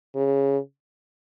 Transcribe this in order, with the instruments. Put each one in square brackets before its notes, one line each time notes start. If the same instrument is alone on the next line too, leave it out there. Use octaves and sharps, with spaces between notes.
[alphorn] C#3